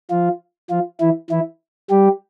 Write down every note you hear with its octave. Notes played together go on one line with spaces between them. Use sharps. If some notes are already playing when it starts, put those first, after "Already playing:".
F3 F4
F3 F4
E3 E4
E3 E4
G3 G4